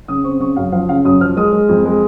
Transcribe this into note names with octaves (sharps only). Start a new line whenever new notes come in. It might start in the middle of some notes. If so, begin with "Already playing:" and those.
C#3 D#6
C4 C#6
C#3 C#6
F#2 F5
F3 F5
C#3 F5
F#2 D#6
F3 F6
G#3 D#6
G#3
F2
G#3